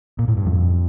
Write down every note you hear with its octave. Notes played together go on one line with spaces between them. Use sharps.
A#2
A2
G2
F2